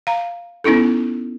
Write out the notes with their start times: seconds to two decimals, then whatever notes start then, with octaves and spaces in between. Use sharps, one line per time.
0.07 F5 A#5
0.64 B3 C#4 D#4 E4 A4